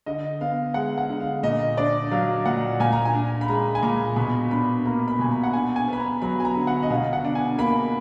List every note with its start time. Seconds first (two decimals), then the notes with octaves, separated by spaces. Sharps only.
0.06 D3 D#5
0.41 B3 F5
0.74 G#3 F#5
0.98 F#5
1.09 D3
1.20 F5
1.43 A#2 D#5
1.77 D4 D5
2.11 F#3 F5
2.46 A#2 F#5
2.80 A#2 G#5
2.93 A#5
3.05 G#5
3.14 D4
3.41 B5
3.48 G#3 A#5
3.75 G#5
3.83 A#2 A#5
4.16 B2 B5
4.51 D4 B5
4.85 A#3 A#5
5.08 B5
5.19 B2 G#5
5.31 A#5
5.43 F#5
5.53 D4 G#5
5.76 G#5
5.87 B3
5.93 B5
5.99 A#5
6.22 F#3 B5
6.40 G#5
6.45 A#5
6.56 D3
6.67 F#5
6.83 D#5
6.90 B2 F5
7.13 F#5
7.24 D4
7.35 G#5
7.58 A#3 B5